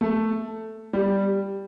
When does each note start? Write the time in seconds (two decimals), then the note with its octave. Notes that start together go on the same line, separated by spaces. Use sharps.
0.01 A3
0.93 G3